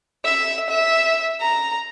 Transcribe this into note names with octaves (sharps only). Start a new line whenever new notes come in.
E5
E5
A#5